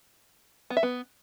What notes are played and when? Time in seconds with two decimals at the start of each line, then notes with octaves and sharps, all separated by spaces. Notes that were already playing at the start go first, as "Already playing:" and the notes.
0.70 B3
0.77 E5
0.83 B3